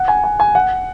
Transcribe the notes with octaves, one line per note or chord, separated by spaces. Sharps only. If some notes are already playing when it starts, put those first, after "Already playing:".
Already playing: F#5
G#5
G#5
G#5
F#5